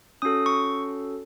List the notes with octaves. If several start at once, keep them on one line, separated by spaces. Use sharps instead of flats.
C#4 F#4 A4 D#6
C#6